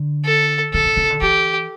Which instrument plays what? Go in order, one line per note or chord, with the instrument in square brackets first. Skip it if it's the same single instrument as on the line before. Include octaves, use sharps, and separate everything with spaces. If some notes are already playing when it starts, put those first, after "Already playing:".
Already playing: [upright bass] D3
[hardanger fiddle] A4
[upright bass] C#3 [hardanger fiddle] A4
[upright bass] C#3
C#3
D3
[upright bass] E3 [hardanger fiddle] G4